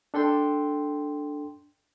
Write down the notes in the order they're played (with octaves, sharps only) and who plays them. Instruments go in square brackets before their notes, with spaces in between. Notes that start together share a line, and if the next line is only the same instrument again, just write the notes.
[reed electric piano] D4 A4 G5 C6